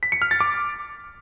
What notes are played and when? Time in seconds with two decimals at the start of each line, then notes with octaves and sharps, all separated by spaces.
0.03 B6
0.12 C#7
0.22 F6
0.31 A6
0.41 D6